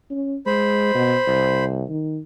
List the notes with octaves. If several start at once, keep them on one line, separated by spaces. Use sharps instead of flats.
C#4
G#3 C5 B5
B2
C2
D#3